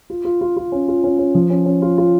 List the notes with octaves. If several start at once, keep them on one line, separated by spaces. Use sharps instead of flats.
F4
F4
F4
F4
C#4
F4
C#4
C#4
F3
C#4
C#4
F4
F4